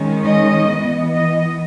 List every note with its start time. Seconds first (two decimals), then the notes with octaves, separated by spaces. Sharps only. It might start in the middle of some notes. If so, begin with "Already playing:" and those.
Already playing: D#3 G#3 C#4
0.24 D#5
0.69 E3 B3
1.12 D#5